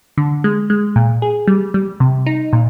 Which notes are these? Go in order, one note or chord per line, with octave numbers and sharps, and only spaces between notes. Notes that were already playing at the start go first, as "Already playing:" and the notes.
D3
G#3
G#3
A#2
G#4
G3
G3
C3
D#4
A#2